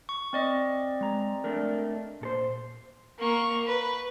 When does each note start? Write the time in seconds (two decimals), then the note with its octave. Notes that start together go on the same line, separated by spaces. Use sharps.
0.09 C#6
0.33 C4 D5 D#5
1.01 G#3 A#5
1.44 A3 D4 A#4
2.21 A#2 A4 C5
3.19 A#3 C#6
3.67 B4